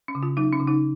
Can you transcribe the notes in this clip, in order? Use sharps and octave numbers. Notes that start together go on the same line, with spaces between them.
C#4
C#3
F4
F#3 D#4
C#4
C#3
D#4